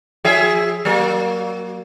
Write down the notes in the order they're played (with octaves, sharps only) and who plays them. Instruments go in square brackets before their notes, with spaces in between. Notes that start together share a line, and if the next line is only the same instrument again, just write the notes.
[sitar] F3 G#4 E5
F#3 A#3